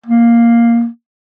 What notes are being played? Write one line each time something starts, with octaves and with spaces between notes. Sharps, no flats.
A#3